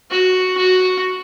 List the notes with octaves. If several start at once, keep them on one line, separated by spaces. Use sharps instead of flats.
F#4
F#4